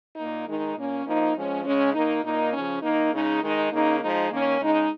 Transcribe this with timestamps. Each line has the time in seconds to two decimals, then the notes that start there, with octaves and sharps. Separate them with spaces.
0.16 A#2 A#3 D#4
0.46 D#3 G#3 D#4
0.76 A#2 A#3 C#4
1.05 F3 A#3 D#4
1.34 F3 G#3 C#4
1.64 C#3 G#3 C#4
1.93 D#3 A#3 D#4
2.23 A#2 A#3 D#4
2.53 C#3 F3 C#4
2.82 D#3 A#3 D#4
3.12 C#3 G#3 D#4
3.41 D#3 G#3 D#4
3.71 C#3 A#3 D#4
4.00 F3 G#3 D#4
4.30 D#3 A#3 C#4
4.60 C#3 G#3 D#4